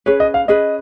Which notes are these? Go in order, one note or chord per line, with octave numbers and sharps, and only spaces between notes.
C#4 G#4 B4 C#5
D#5
F5
C#4 G#4 B4 D#5